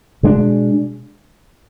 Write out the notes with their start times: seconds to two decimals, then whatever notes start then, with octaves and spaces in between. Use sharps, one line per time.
0.23 B2 G#3 B3 D4